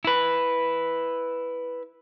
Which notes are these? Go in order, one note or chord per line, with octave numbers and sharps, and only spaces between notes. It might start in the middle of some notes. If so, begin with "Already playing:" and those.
E4 B4